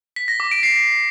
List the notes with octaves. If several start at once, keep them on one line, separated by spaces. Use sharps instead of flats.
B6
A#6
D6
D7
C7